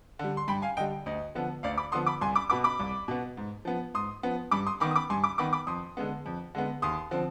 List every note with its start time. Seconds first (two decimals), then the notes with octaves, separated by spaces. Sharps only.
0.19 D3 G3
0.37 C6
0.48 G2 G5 B5
0.62 F5 G#5
0.77 D3 D#5 G5
0.80 G3
1.06 D2 D#5
1.35 D3 F3 B3
1.63 D2 D5 F5
1.78 B5 D6
1.92 D3 F3 B3 C6 D#6
2.06 B5 D6
2.21 C2 G#5 C6
2.35 B5 D6
2.50 B2 B3 B5 D6
2.64 B5 D6
2.79 C2
3.08 B2 B3
3.37 G#2
3.65 F3 B3
3.94 G#2 C6 D#6
4.23 F3 B3
4.51 G2 B5 D6
4.67 C6 D#6
4.80 D#3 B5 D6
4.85 B3
4.91 D#6
4.96 B5 D6
5.10 G2 G#5 C6
5.24 B5 D6
5.38 D#3 B3 B5 D6
5.53 B5 D6
5.67 F2 C6 D#6
5.97 D3 G#3 B3
6.26 F2
6.55 D3 G#3 B3
6.82 D#2 C6 D#6
7.11 D3 F3 C4